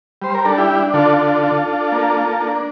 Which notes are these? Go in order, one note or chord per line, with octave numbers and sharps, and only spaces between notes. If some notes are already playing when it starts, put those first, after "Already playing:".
G3 C5
A#4
D4 A4
E4 G4
D4
D3 F4 A4
D4
D4
D4
A#3
A#3
D4